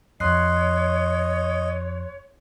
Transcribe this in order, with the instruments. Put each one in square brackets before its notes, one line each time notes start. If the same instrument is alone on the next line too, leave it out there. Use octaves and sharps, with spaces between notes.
[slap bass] F2 [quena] C#5 [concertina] D#5 [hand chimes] C6 F#6 C7